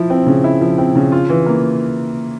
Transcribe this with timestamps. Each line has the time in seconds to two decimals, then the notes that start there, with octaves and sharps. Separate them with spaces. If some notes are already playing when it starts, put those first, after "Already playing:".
Already playing: F3 E4
0.10 C4
0.26 C#3
0.44 E4
0.61 F3
0.78 C4
0.95 C#3
1.12 F4
1.29 E3
1.46 A#3